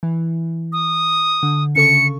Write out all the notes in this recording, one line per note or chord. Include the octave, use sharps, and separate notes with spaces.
E3
D#6
D3
C#3 A4 C#6 C#7